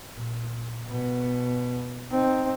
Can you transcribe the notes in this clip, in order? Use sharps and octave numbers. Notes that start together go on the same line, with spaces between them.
A#2
B2 B3
C4 D#4